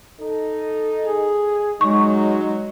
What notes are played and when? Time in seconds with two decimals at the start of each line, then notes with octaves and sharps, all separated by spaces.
0.20 D#4 A4
1.04 G#4
1.81 F#3 G#3 D#4 C#6